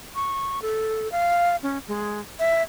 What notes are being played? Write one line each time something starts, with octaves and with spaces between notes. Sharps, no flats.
C#6
A4
F5
C#4
G#3
E5